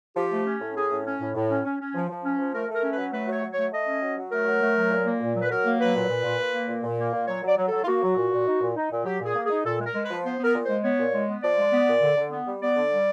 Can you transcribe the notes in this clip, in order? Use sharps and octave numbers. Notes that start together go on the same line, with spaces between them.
F3 G4
A3
C#4
A2
C#4 G#4
A2
C#4
A2
A2
C#4
C#4
C#4
F3
F3
C#4
F3
A3 A#4
A3
A#4
C#4
F#3 B4
A3 B4
F#3
C#5
F#3
C#5
A3
A3 D#5
C#4
F#3
F#3
A3 A#4
F#3
A3
F#3
A#2
A#3
A#2
F#3
B4
F#3 A#4
A#3
F#3 B4
A#2
A#2
A#2
A#2
A#3
A#2
A#2
A#3
A#2
F#3 C#5
F#3 D5
F#3
F#3 A4
F4
A#3 F#4
F#3
A#2
A#2
D#4
A#2
D#4
A#2
F#3 G4
A#2
G#4
A#3
D#4 G#4
A#2 A4
G#3
A#4
G#3
B4
F3
B3 C5
B3 A#4
A#2
G#3 C5
B3 C#5
A#2
G#3
B3
F3 D5
G#3
B3
A#2
D3
D3
B3
G3
B3 D5
D3
G3